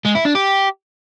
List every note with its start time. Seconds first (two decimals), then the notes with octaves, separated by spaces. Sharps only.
0.06 G#3
0.15 E4
0.25 D4
0.35 G4